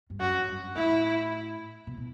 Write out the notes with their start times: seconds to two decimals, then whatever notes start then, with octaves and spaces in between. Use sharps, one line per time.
0.10 G2
0.19 F#2 F#4
0.42 F#2
0.48 G2
0.76 A2 E4
1.87 B2
1.97 B2